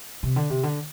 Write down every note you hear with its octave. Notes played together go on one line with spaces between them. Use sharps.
C3
D3
C3
D3